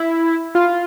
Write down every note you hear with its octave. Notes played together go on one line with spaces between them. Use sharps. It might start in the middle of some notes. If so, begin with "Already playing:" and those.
Already playing: E4
F4